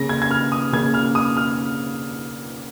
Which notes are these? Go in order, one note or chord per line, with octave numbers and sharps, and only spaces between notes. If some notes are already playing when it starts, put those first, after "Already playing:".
Already playing: C#3 A#3 A#6
G#6
G#6
F6
D#6
C#3 A#3 G#6
F6
D#6
F6